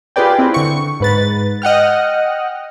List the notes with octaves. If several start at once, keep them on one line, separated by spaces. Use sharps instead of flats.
F4 G4 G#4 B4 D5 G5
C4 E4 B4
D3 C#6
G#2 B4 A6
D#5 F#5 G5 F6